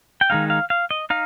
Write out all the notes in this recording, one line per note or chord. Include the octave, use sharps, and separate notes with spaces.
G5
D#3 G#3 D#4 F5
F5
F5
D#5
D#4 F5